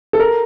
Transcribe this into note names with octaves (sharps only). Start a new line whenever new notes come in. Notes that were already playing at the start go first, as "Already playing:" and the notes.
A4
A#4